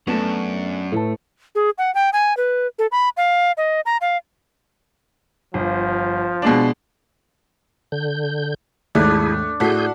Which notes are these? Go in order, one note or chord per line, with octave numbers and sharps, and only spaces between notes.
F#2 A3 B3 C#4 D4 A5
A2 A3 B4 A5
G#4
F#5
G5
G#5
B4
A4
B5
F5
D#5
A#5
F5
G1 F3
B2 G#3 D4
D3 G6
D#2 G#2 A3 D4 E4 G#4
A2 F#4 G#4 A4 G6 B6 C7